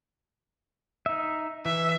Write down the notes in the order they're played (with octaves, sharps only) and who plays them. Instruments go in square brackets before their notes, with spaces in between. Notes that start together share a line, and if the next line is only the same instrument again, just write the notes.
[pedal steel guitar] D#4 E5
[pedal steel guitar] E3 [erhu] E5